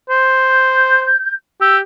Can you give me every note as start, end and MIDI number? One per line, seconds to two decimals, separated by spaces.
0.09 1.10 72
0.47 1.32 91
1.61 1.80 67
1.61 1.76 88